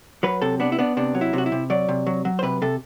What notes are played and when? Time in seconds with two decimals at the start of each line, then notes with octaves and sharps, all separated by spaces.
0.23 F#3 B4
0.42 C3 A4
0.60 B3 D4
0.72 E4
0.79 B3 D4
0.97 C3 D4
1.15 F#3
1.21 E4
1.33 C3 F#4
1.46 E4
1.52 C3
1.70 F#3 D5
1.89 C3
2.07 F#3
2.25 F#3
2.39 C5
2.43 C3 B4
2.62 C3 A4